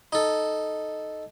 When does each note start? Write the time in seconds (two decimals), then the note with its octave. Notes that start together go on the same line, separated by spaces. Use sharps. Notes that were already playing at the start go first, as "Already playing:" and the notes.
0.13 D#4 A4